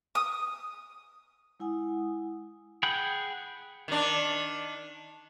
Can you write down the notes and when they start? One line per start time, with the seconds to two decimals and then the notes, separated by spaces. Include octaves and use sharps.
0.15 D#6
1.60 G#3 E4 F#5 G#5 D#6
2.83 G#4 F#5 G5 B5
3.88 D#3 D4